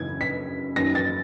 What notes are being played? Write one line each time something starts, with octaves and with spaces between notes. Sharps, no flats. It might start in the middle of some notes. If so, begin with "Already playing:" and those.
Already playing: F#2 C#3 E3 G#6
B6
F#2 D#3 A#6
A6